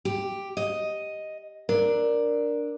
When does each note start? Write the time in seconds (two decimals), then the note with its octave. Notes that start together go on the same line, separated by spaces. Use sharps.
0.05 G4
0.57 D#5
1.69 D4 A#4